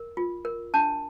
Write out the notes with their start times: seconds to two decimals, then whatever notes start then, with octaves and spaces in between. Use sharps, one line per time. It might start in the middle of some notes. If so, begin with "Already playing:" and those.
Already playing: A#4
0.17 F4
0.45 A#4
0.74 D4 A5